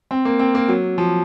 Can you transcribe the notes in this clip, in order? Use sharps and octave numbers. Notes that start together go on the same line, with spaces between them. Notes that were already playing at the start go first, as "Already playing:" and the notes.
C4
A#3
C4
A#3
F#3
F3